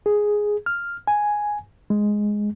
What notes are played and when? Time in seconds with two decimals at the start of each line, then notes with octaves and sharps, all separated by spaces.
0.06 G#4
0.66 F6
1.07 G#5
1.90 G#3